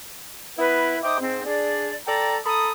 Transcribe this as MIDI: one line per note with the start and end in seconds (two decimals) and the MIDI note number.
0.58 0.98 59
0.58 0.98 64
0.58 0.98 71
1.03 1.19 63
1.03 1.19 72
1.03 1.19 76
1.03 1.19 79
1.03 1.19 86
1.03 1.19 87
1.21 1.43 44
1.21 1.43 60
1.46 1.93 62
1.46 1.93 68
1.46 1.93 74
2.07 2.38 69
2.07 2.38 74
2.07 2.38 79
2.07 2.38 82
2.46 2.71 69
2.46 2.71 82
2.46 2.71 83
2.46 2.71 87